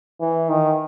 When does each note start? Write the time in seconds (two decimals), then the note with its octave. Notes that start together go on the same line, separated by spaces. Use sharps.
0.20 E3
0.49 D#3